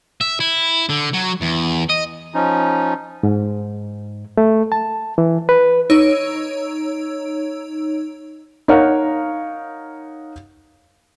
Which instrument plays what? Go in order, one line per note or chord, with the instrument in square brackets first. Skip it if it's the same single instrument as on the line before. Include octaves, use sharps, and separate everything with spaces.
[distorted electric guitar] E5
E4
D3
F#3
E2
D#5
[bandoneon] F3 C#4 D#4
[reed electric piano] G#2
A3
A5
E3
B4
[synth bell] D#4 C#5 E6 D7
[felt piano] D#4 A#4 C#5 F5 F#5